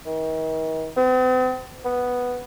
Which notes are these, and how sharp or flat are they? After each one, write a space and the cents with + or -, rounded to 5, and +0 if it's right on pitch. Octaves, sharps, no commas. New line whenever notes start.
D#3 +40
C4 -45
B3 +0